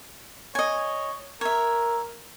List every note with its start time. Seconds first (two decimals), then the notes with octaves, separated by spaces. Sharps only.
0.55 C#5 D#5 G#5
1.41 A#4 C#5 E5